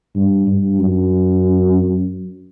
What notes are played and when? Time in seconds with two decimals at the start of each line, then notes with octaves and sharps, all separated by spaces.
0.15 G2
0.47 G2
0.79 F#2